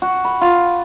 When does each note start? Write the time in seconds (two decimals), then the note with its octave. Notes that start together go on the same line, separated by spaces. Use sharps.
0.02 F#4
0.25 B5
0.41 F4